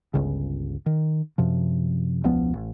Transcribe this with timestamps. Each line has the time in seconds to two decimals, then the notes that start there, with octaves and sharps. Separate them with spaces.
0.14 G1 C#2 C#3
0.86 D#3
1.38 F#2 C3 F3
2.24 E1 C#2 F3 B3
2.54 A1